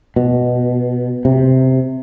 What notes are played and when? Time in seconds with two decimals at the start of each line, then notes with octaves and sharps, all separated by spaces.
0.16 B2
1.25 C3